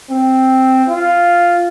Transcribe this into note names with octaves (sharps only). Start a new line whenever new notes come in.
C4
F4